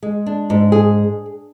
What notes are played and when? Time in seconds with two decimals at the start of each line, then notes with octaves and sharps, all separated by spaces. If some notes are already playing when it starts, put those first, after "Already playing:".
0.03 G#3
0.26 D4
0.50 G#2
0.72 G#4